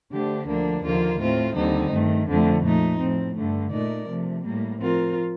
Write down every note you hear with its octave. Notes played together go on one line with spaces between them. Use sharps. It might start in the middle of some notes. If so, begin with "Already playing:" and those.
D3 A3 D4 G4 C5
D2 D3 F3 A#3 D4
D#2 D3 F3 A#3 F4
A2 A3 C4 F4
D#2 D3 G3 C4 D#4
G2 D#3 A3
F2 D3 F3 A3
A#2 F3 A3 D#4
A2 F3 C4
G2 D3 A3
A#2 A3 D#4 A#4 D5
C3 F3 A3
A2 G3 A#3
F3 C4 F4 A#4